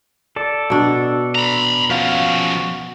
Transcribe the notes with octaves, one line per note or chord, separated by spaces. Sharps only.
A4 D5
B2 D4
A#5 B5
F3 C#4 F#4 F5